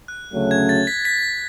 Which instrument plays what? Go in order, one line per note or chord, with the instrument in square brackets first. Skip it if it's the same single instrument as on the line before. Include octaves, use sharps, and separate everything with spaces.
[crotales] F#6
[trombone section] D2 C#3 F#3 A3 C#4
[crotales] G#6
A6
B6
B6